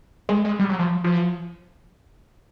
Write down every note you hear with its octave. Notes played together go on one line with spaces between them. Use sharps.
G#3
G#3
G3
F#3
F3
F3